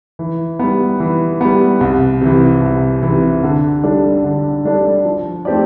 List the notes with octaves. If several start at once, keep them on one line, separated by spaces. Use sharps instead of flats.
E3
G3 B3
E3
G3 B3
C2
C3 E3
C2
C3 E3
D3
G3 D4 A4 D5
D3
G3 D4 A4 D5
F3
A3 C4 G4 D5